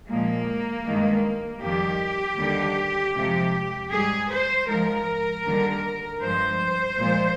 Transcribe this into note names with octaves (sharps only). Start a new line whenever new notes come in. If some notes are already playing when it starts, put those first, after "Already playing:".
A#2 F3 G#3 A#3
G2 D#3 G#3
F2 D#3 G3 G4
D#2 D3 G3
F2 C3 F3 G#3
G#2 G3 G#4
C5
G#2 F3 G#3 A#4
D#2 D3 G3
G2 F3 G#3 C5
A#2 F3 G#3